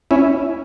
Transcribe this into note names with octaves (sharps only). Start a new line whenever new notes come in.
C#4 E4